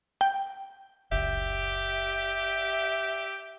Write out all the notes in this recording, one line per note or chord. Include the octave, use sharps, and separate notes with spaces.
G5
F#1 C#2 G4 E5